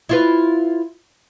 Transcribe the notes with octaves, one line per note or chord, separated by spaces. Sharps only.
E4 F4 B4